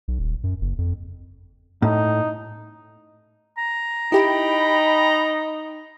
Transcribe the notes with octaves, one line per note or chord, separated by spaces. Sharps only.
B1
D#1
F#2
F#1
F2
A2 D#4
A#5
D#4 E4 G4 G5 B5